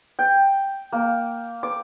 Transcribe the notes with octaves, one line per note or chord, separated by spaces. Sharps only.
G5
A#3
D6